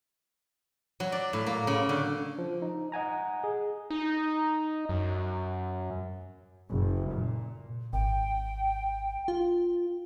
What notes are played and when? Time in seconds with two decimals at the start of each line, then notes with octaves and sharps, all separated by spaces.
1.00 F#3
1.12 D5
1.33 A2
1.46 A#3
1.67 C#3
1.89 D3
2.38 F3
2.62 D#4
2.92 D#5 F#5 G#5 A#5
3.44 G#4
3.90 D#4
4.89 F#2
6.70 F#1
7.11 A#2
7.93 G#1 G5
9.28 F4